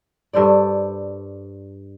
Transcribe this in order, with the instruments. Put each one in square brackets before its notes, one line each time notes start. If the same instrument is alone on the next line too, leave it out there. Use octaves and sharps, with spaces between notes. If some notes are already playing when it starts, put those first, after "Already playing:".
[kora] G2 A4 C5 D5